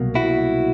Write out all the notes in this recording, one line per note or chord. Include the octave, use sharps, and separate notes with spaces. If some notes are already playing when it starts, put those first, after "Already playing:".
Already playing: C2 B2 F#3 A#3
E4 F#4